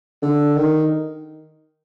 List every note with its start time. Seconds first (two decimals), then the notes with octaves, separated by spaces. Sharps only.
0.22 D3
0.57 D#3